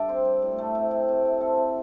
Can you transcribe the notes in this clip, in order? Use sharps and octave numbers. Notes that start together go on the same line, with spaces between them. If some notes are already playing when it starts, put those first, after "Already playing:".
Already playing: G2 A4 D5 E5
C4 C5
G3
A2
A3
C3
C3
C3
C3
C4 A4
C4